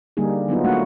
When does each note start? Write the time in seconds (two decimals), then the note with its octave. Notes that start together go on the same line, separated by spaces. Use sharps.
0.17 D3 G3 A#3 D#4 G#4
0.49 F#3 B3 D#4 F4
0.65 A3 A#3 D4 F#4 F#5